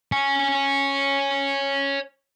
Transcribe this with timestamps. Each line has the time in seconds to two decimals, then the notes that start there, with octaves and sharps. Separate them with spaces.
0.12 C#5 G#5